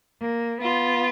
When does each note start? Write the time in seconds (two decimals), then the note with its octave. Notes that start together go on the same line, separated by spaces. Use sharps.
0.21 A#3
0.62 B3 F4